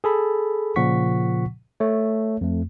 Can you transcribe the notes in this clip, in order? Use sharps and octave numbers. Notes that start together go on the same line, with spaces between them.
G#4 A4 B5
A#2 C#3 F3 F#5 C#6 B6
A3 C#5
F2 A3